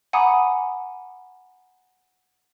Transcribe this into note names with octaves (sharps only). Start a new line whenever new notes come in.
F#5 G#5 A#5 B5 D6 D#6